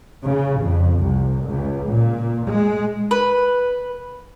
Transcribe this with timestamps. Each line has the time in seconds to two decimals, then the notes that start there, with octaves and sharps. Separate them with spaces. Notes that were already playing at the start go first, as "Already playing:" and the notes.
0.24 C#3
0.62 F2
1.02 C2
1.46 C#2
1.89 A#2
2.48 G#3
3.11 B4